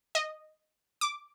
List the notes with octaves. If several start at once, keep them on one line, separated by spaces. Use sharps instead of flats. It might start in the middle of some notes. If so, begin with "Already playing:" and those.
D#5
D6